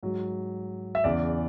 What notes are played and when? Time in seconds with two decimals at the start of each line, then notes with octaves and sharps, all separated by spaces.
0.03 G#2 F#3
0.95 E5
1.04 E2 C#3 E3 D5